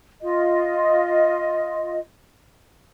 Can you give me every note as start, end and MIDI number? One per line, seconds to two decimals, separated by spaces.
0.22 1.99 65
0.22 1.99 75